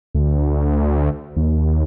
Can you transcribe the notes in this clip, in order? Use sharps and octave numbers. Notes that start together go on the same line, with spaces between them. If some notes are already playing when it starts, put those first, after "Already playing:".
D2
D#2